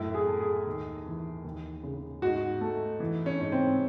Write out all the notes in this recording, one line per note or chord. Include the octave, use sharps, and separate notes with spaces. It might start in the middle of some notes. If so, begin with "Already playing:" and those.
Already playing: F#2 A2 E4
G#4
A3
G#4
D#2
E3
D#2
C#3
G#2 F#4
A3
E3
C#4
G#2
C4